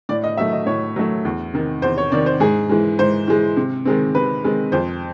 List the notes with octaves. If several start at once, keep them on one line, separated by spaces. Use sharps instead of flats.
A2 D5
D#5
F#3 A3 E5
D#5
A2 C#5
F#3 A3
E2
C3 D#3
E2 C5
C#5
C3 D#3 D5
C5
G#2 G#4
E3 G#3
G#2 C5
E3 G#3
C3
D#3 G#3 C4
C3 B4
D#3 G#3 C4
F2 C5